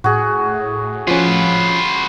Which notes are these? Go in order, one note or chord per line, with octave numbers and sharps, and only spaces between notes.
A2 F#4 G#4
F3 C#4 F4 B4